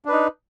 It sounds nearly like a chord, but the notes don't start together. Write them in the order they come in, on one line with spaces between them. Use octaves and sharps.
D4 B4 D#4